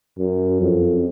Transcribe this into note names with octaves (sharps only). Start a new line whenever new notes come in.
F#2
F2